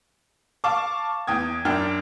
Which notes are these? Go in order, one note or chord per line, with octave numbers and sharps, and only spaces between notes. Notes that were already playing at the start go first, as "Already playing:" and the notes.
F5 A5 C#6 D6
E2 G5 D#6 G#6
F#2 D4 G5 F6